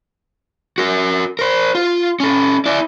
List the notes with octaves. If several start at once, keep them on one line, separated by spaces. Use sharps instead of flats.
F#4 A#4
A#4 C5
F4
C#4 A4
E4 D5